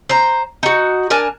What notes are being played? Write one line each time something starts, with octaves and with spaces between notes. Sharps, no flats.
C5 A#5
D#4 F#4
D4 A#4 G#5 A5